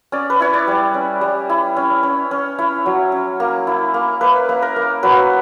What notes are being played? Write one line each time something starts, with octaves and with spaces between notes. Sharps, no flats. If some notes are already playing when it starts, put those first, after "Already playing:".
C#4 D5
B4
E4 C#5
D5
G3
C#4
G3
E4
C#4
C#4
C#4
E4 C#5
F#3
C#4
A#3
E4
A#3
A#3 B4
A#3
A#4
A#3
F#3 B4